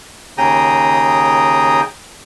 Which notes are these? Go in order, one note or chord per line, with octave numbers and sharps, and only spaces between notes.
D#2 C#3 G#4 G5 A#5 D#6